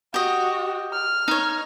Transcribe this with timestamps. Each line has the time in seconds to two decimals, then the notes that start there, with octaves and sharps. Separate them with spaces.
0.14 F#4 G4 D#5
0.93 F6
1.28 D#4 C#5